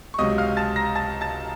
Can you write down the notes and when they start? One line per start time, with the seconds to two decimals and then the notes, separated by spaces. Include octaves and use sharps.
0.14 C#6
0.18 C#2 C3 F#3 D#5 D#6
0.38 F5 F6
0.57 A5 A6
0.76 A#5 A#6
0.95 A5 A6
1.21 A5 A6